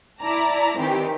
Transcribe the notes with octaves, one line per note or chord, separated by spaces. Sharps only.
E4 D5 A5 A#5
D#3 E3 C4 G4